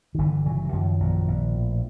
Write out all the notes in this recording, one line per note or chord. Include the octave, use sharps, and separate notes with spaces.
D#3
G1 D3 E3
C#3 E3 F#3
F#3
F#2 D#3 F3
A#1
A#1
A2